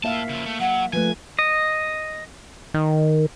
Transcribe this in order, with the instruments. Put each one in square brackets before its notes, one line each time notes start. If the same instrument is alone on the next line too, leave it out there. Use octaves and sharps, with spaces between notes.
[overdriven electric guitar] A2 A5 [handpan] A#3 E5 F5
[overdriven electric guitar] C#3 F3
A3
[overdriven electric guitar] F#3 [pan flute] F#5
[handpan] F3 A3 [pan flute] B4 [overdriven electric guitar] G#5
[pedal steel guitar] D#5
[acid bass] D#3